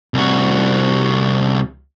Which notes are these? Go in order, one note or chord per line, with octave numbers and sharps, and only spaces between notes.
C2 F#4